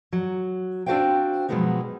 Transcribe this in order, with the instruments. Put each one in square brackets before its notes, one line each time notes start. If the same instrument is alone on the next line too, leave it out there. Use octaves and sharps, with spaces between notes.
[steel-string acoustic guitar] F#3
C4 D4 F#4 C5 F5 G5
B2 F3 F#3 G#3 B3 D#4